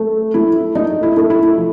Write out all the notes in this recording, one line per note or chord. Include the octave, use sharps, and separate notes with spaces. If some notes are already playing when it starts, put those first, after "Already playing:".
Already playing: A3
A3 E4
A3 D#4
E4
A3
E4
F3